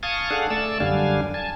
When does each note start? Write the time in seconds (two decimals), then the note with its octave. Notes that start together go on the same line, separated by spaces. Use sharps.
0.03 F5 G#5 A5 C#6 D#6
0.31 D4 G#4 A4 F5 F#5
0.50 A3 D5 A5 E6
0.80 F#2 D3 G3 D4 F5 G#5
1.34 G#5 A5